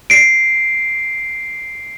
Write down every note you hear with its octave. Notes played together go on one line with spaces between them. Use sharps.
C7 D7